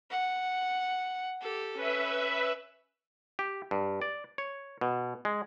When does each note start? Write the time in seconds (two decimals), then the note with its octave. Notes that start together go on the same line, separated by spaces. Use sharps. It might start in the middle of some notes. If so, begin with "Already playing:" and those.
0.11 F#5
1.41 G4 A4
1.76 C#4 B4 E5
3.39 G4
3.71 G2
4.02 D5
4.38 C#5
4.81 B2
5.25 G#3